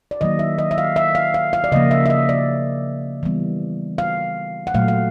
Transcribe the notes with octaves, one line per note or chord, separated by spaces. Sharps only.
D5
D#3 F#3 A#3 D#5
E5
D#5
E5
F5
E5
F5
F5
F5
D5
C#3 F3 A#3 D#5
E5
E5
D#5
D5
E3 G3 B3
F5
F#5
A#2 F#3 A3 F5
F5